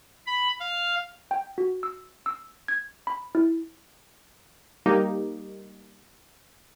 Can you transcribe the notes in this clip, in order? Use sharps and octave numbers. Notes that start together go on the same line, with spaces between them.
B5
F5
G5
F#4
E6
E6
G#6
B5
E4
G3 A#3 D#4 G4